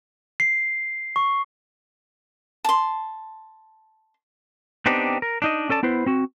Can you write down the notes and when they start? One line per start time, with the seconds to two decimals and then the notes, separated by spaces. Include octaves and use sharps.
0.40 C7
1.16 C#6
2.64 A5 C6
4.86 B3 C4 D4 D#4 G4
5.22 A#4
5.42 D4 D#4 D#5
5.69 C#4 A4 D5 A5
5.83 B3 E4 B4 C5
6.06 C4 F#4